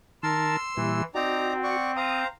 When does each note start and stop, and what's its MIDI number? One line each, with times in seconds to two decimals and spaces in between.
0.23 0.57 51
0.23 0.56 70
0.23 0.56 81
0.23 1.03 84
0.23 1.03 88
0.77 1.02 46
0.77 1.04 52
0.77 1.02 55
0.77 1.02 64
1.15 2.24 60
1.15 1.53 63
1.15 1.77 66
1.15 1.53 74
1.15 1.53 82
1.63 1.91 74
1.63 1.91 78
1.63 1.91 85
1.96 2.27 72
1.96 2.27 77
1.96 2.27 82
1.96 2.22 87